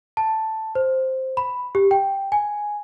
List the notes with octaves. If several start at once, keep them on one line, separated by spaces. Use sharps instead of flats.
A5
C5
B5
G4
G5
G#5